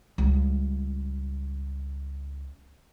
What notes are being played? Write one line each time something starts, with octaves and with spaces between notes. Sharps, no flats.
C#2 G3